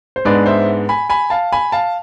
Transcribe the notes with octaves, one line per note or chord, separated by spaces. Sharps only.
C5
G#2 G#3 B3 D4 B4 D5
C5 E5
G#5 B5
G#5 B5
F5 A5
G#5 B5
F5 A5